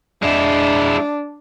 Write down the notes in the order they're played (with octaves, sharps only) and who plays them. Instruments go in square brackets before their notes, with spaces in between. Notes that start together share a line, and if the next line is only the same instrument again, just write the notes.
[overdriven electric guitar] G#3 E4 [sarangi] D4